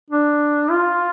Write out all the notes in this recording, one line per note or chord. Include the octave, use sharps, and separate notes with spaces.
D4
F4